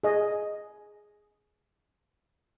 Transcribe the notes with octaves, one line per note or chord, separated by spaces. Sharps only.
G#4 D#5